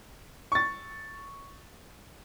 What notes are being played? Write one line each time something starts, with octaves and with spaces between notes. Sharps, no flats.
C#6 A6